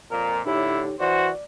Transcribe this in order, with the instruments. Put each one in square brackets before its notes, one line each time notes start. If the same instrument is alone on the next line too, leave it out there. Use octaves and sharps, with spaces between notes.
[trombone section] F2 A#2 [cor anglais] A#4
[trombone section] A2 D3 [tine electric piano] D#4 G4 C#5 [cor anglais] E4
[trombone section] E3 F#4 [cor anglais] C5 [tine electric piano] D5